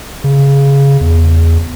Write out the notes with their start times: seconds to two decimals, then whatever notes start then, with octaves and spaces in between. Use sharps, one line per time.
0.24 C#3
1.01 E2